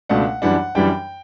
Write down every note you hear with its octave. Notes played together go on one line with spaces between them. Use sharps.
C#2 B2 A3 D4 F#5
F#2 E3 G3 D4 F#5
F#2 E3 G3 D4 G5